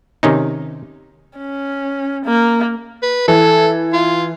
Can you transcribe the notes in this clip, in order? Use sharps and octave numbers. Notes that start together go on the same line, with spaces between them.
C3 D#3 C#4 D#4
C#4
A#3
B4
E3 A4
F4